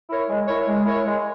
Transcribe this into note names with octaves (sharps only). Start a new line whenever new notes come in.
E4 A#4 C#5
G#3
E4 A#4 C#5
G#3
E4 A#4 C#5
G#3